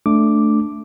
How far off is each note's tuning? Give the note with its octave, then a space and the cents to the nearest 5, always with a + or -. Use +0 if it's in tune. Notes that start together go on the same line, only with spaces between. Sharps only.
A3 +0 D4 +0 D6 +0